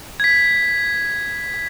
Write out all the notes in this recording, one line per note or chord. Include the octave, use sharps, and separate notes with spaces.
G#6 B6